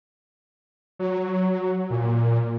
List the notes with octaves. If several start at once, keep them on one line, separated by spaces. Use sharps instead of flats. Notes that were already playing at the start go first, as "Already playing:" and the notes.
F#3
A#2